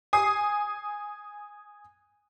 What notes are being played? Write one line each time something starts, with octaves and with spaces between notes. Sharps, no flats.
G#5 D#6 C7